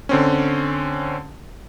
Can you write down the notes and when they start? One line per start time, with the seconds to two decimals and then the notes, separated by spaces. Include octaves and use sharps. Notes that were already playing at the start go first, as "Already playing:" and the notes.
0.09 D3 C4 C#4